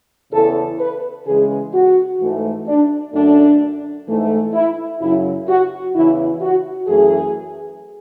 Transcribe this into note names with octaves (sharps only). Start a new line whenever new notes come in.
E2 C#3 E3 A4
B4
C#3 E3 G#3 G#4
F#4
G#2 E3 A3
D4
F#2 D3 A3 D4
G#2 E3 A3
E4
F#2 C#3 F#3 E4
F#4
E2 C#3 E3 E4
F#4
F#2 E3 A3 G#4